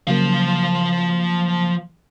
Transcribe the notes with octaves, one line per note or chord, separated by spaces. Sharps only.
C#3 F3 F#3 A#3 F5